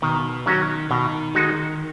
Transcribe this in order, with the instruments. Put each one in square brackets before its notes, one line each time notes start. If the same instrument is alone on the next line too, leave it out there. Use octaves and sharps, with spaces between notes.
[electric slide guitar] B2 [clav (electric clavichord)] D#3
[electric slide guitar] D#3 [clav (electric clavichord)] F#3 C#4 F#4
[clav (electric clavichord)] B2 [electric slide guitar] D#3
[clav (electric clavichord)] G#3 D#4 F#4